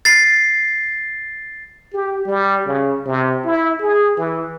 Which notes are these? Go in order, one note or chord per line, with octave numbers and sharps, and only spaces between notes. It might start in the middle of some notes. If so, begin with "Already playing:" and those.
A6 C7
G4
G3
C#3
C3
E4
G#4
E3